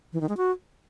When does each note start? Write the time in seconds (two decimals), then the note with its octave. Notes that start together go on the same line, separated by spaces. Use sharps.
0.13 E3
0.21 D#3
0.29 G#3
0.37 F#4